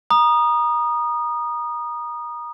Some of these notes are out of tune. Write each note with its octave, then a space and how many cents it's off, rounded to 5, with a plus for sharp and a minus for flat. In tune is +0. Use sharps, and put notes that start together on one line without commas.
A#5 +30 D#6 -20